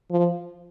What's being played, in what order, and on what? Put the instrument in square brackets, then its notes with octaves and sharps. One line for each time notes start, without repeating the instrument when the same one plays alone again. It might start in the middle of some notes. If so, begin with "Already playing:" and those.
[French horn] F3